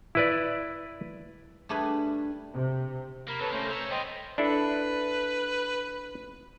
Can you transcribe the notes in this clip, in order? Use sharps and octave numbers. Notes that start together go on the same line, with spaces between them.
E4 B4 D5
G3 A3 D4 G#4 B4
C3
A#3 A#4 B5
D#3 C4 A4 B4 C#5
C3 A3 A#3 C#4 C5
C5 C#5 A#5 E6
G3 B3 C5 D#5 G5
D4 E4 A4 B4